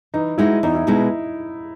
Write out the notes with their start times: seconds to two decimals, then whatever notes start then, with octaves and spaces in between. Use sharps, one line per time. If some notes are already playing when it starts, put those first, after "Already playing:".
0.14 E3 D#4
0.38 G#3 D#4 E4 F#4
0.63 E2 D#4
0.75 E4
0.87 B2 G#3 B3 D#4 E4